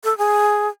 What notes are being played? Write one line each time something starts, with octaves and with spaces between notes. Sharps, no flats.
A4
G#4